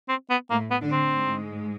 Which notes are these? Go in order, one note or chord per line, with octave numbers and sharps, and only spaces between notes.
C4
B3
A2 A3 A#3
B3
D3 D4
C4
G#2 G#3